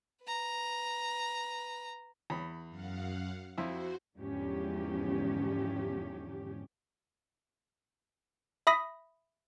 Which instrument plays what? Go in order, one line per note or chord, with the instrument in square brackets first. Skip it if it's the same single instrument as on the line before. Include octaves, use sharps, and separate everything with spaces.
[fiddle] B4 A#5
[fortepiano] E2 B5
[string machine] F#2 F5 F#5
[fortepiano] F2 E4 [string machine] F#4 C5
[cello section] E2 G#2 D3 F3 C#4 G4
[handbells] E5 B5 D#6 A#6 B6